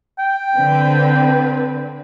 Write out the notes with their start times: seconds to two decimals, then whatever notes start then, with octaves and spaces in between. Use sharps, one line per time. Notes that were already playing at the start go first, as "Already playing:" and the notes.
0.19 G5
0.57 D3 C4 B4